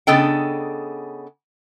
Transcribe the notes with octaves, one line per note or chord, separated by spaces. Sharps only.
C#3 B3 D4 A4 D#5 G5